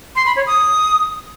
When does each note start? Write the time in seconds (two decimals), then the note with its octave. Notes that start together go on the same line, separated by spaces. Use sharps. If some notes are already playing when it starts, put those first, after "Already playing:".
0.16 C6
0.26 B5
0.36 C#5
0.47 D#6